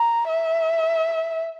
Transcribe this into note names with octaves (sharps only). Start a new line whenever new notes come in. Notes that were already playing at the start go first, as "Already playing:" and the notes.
Already playing: A#5
E5